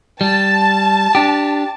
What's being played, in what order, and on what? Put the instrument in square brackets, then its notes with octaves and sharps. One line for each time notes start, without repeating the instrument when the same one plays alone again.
[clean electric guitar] G3 [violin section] A5
[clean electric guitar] D4 G4